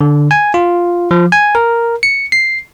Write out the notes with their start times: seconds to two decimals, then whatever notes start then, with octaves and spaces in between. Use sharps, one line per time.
0.01 D3
0.31 G#5
0.54 F4
1.11 F3
1.32 G#5
1.55 A#4
2.03 C#7
2.32 C7